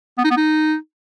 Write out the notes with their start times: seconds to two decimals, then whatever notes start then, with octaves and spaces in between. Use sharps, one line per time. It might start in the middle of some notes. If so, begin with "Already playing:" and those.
0.18 B3
0.24 D#4
0.31 B3
0.37 D#4